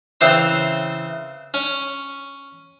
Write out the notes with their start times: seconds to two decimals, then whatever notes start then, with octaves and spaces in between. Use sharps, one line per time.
0.21 C#3 E3 C4 C5
1.54 C#4